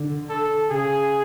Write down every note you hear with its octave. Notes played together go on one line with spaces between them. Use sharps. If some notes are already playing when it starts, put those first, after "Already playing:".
Already playing: D3
A4
C#3 G#4